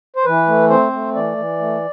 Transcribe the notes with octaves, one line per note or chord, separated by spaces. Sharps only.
C5
E3 B4
A3
C4 C5
A3
E3 D5
E3
A3